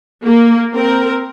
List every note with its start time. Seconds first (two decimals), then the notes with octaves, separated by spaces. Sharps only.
0.24 A#3
0.74 C4 A#4